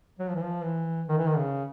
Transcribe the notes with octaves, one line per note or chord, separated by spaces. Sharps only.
F#3
F3
E3
F3
E3
D#3
E3
D#3
C#3